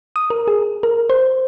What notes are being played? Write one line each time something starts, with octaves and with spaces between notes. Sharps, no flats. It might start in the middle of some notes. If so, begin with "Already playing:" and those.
D#6
A#4
G#4
A#4
C5